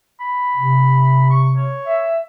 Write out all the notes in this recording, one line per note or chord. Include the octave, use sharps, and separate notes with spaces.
B5
C3
C#6
C#5
E5